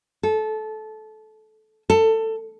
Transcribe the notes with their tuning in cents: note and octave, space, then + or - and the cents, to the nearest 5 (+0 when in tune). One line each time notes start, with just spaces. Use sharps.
A4 -20
A4 +20